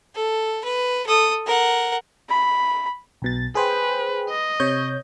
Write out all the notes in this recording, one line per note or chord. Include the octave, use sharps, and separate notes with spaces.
A4
B4
A4 D#6
A#4 F#5
B5
B1 B2 A6
G#4 B4 C5 G5
D#5
C3 C#5 G6